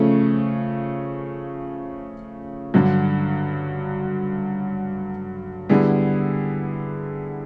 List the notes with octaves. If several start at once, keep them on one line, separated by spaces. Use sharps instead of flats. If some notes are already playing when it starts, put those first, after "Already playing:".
Already playing: C#3 F3 A3 C#4
G2 D3 F#3
D3 G3 B3 E4 G#4